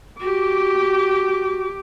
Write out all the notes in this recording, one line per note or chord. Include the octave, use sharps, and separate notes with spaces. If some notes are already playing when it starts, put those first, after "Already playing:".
F#4 G4 D6